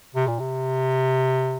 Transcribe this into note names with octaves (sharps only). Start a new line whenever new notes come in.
C3
A#2
C3